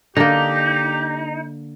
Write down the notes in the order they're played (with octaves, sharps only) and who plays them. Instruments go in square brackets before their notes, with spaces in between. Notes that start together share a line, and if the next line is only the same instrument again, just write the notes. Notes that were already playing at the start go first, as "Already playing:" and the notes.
[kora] D3 A#3 [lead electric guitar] D#4 [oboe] G4